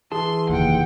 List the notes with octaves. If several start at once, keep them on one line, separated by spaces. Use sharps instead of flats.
E3 G#4 A5 C6
F1 D#2 F#5 G5